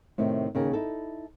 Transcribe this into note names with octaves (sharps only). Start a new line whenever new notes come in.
A2 C3 D#3
D#2 C#3 A#4
D#4 E4 A4